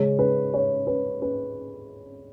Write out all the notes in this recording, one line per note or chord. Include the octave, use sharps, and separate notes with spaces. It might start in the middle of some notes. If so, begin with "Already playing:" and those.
Already playing: C#3 G#3 C#5
B4
C#5
B4
B4